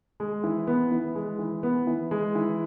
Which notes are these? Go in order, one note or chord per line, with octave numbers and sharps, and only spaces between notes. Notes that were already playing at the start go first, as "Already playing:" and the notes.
G#3
E3
B3
E3
G#3
E3
B3
E3
G#3
E3